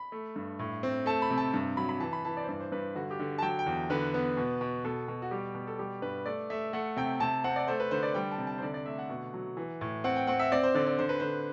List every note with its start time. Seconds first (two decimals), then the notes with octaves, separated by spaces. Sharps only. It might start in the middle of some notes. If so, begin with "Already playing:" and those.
Already playing: B5
0.12 A3
0.36 G2
0.59 A2
0.83 C4
1.06 A3 A5
1.22 B5
1.30 C3
1.38 A5
1.54 G2
1.77 F#3 B5
1.89 B5
2.00 E3 A5
2.13 B5
2.25 E3 A5
2.37 D5
2.43 C5
2.49 G2 D5
2.60 C5
2.72 G2 B4
2.95 D3 F#4
3.11 G4
3.19 D3
3.38 A5
3.42 F#3 G5
3.59 G5
3.66 E2
3.90 D3 B4
4.14 B3
4.37 B2
4.61 B2
4.84 B2 A4
5.08 B2
5.22 F#4
5.31 G3 G4
5.55 B2
5.67 A4
5.79 G3 G4
6.02 G2 B4
6.26 A3 D5
6.50 A3 E5
6.73 A3 F#5
6.97 C3 G5
7.20 C3 A5
7.44 C4 F#5
7.56 D5
7.68 A3 C5
7.80 B4
7.91 D3 C5
8.03 D5
8.15 G3 G5
8.32 A5
8.38 C3
8.47 A5
8.58 C5
8.62 D3 D5
8.74 D5
8.86 A3 E5
8.98 F#5
9.09 B2
9.34 F#3
9.57 E3
9.81 A2
10.04 C4 F#5
10.16 G5
10.27 C4 F#5
10.40 E5
10.52 C4 D5
10.64 C5
10.74 D3 D5
10.87 D5
10.99 D3 C5
11.09 B4
11.20 D3 C5